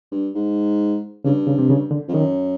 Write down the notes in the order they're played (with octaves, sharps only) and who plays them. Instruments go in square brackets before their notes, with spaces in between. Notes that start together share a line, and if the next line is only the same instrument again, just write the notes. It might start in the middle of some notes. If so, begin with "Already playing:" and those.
[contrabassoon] G2
G#2
[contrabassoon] G2 [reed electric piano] C#3
[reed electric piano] C#3
C3
C#3
D3
[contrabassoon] F2
[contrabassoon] F#2 [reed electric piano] D#3